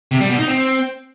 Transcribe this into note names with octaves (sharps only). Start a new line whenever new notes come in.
C3
G3
B2
D#4
C4